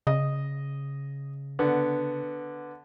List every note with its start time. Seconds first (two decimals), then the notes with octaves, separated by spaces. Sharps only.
0.07 C#3 D#5
1.59 D3 B3